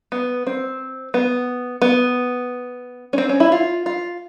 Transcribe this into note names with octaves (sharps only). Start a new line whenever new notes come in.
B3
C4
B3
B3
C#4
C4
C#4
E4
F4
F4